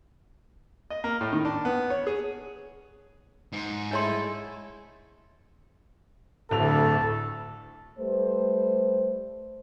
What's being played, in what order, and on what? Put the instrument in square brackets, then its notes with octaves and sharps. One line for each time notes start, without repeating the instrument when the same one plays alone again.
[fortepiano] D#5
A#3
A2
D#3
D4
B3
C#5
G#4
[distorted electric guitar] G#2
[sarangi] G#3 [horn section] A3 E4 A4 [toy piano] D4 C#5 C6
[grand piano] D1 F7 [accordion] D2 [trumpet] A4
[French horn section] G3 A3 B4 C5